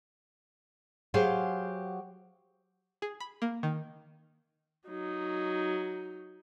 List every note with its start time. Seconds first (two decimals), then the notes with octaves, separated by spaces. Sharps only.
1.14 F#3 G4 G#4 C5 F5
3.02 G#4
3.20 B5
3.42 A#3
3.63 D#3
4.88 F#3 D#4